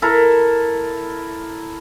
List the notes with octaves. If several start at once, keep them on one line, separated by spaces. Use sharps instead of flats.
E4 A4 A#4